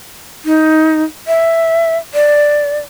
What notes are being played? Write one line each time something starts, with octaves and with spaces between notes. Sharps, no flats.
D#4
E5
D5